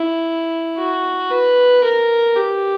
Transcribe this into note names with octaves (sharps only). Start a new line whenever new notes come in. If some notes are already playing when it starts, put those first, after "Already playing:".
Already playing: E4
F#4
B4
A#4
G4